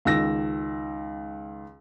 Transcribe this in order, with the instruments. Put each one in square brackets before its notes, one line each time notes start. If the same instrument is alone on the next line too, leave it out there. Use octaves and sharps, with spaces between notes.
[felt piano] C#2 D#3 E6 A#6